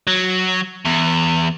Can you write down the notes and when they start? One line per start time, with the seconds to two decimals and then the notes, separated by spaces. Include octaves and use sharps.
0.07 F#3
0.85 E2